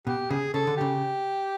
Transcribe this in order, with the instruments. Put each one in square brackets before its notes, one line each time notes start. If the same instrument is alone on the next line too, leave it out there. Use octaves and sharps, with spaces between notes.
[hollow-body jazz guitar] B2 [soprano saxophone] G4
[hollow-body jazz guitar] C#3 [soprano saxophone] G#4
[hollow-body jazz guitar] C#3 [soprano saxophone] A4
[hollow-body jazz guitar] D3
[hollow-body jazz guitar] C#3 [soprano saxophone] G4